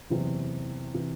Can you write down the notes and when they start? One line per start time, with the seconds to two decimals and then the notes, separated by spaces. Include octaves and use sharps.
0.10 F#1 E2 C3 E3
0.94 C3 E3